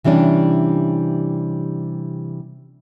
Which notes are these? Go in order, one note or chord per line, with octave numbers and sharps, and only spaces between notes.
C3 E3 G3 C#4 D4